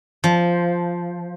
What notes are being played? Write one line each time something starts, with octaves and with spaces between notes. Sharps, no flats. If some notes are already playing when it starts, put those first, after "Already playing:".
F3